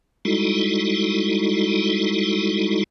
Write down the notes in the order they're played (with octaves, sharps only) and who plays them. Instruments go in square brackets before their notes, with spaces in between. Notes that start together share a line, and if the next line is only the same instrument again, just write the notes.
[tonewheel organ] G3 G#3 D#4 E4 F#4 A4